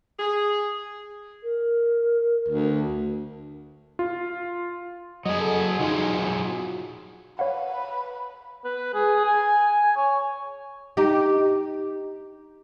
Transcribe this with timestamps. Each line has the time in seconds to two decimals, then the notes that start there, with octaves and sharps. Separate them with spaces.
0.19 G#4
1.44 A#4
2.48 D2
3.99 F4
5.25 F#3 G#4 D#5
5.41 A4
5.80 F#3 D#4 F4 G#4
6.18 F#4
7.39 B4 C#5 F5 F#5
8.65 B4
8.94 G#4
9.24 G#5
9.83 G#5
9.96 C#5
10.97 D#4 G4